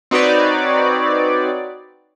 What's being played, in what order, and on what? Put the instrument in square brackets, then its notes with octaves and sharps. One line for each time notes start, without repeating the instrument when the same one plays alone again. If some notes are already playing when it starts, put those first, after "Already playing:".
[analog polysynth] C4 D#4 F#4 B4 C#5 D5